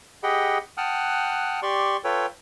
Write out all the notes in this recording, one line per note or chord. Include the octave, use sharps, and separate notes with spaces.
G4 G#4 D#5 F#5 G5 B5
F#5 G5 A5 D#6 F6 F#6
G4 D5 C6 C#6
F4 A4 B4 C#5 G5